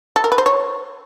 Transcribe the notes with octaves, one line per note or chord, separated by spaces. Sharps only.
A4
A#4
B4
C5
C#5